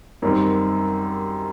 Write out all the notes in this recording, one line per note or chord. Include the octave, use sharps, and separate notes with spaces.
F#2 D#3 G3 C4